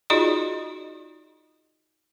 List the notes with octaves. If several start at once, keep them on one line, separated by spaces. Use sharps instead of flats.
D#4 F4 F#4 G#4 D5 D#5